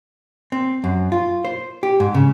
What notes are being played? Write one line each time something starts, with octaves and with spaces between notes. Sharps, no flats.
C4
F#2
F4
C5
G4
G#2
C#3